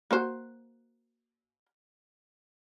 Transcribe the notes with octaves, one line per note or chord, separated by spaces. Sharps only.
A#3 F#4 C5